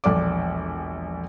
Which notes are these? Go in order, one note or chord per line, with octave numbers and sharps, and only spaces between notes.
E1 A#1 A4 D5 D6